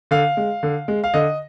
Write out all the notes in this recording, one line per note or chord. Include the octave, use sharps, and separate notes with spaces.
D3 F5
G#3
D3
G#3
F5
D3 D#5